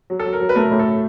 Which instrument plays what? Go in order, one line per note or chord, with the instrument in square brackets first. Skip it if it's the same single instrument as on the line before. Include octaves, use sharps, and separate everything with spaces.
[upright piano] F#3
[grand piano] A4
[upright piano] F#3
[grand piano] A#4
[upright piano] F#3
[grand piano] B4
[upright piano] A3 [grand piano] A#4
[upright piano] A2
[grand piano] A4